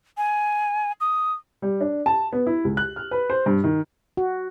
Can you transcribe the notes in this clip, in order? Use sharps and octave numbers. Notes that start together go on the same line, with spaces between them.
G#5
D#6
G3
D4
A5
B3
E4
C#2
F#6
F6
B4
C5
G2
D#3
F#4